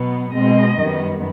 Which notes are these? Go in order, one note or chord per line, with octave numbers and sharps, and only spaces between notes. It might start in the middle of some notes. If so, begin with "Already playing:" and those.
Already playing: B2 F#3 B3
B2 G#3 C4 D#5
F#2 D#3 G3 B3